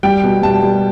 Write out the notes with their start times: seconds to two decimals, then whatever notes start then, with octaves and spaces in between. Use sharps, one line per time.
0.03 G3 G5
0.23 B2
0.43 G3 A5
0.63 G3